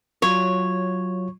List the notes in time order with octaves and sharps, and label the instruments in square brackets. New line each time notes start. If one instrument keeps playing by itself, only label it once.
[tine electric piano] F#3 F4 [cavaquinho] C#5